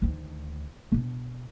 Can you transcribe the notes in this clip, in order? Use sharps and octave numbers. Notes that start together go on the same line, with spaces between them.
D2 D#3
B2 D4